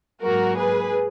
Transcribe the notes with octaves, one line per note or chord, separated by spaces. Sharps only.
G#2 F#3 A#3 F#4 A#4
G#4 B4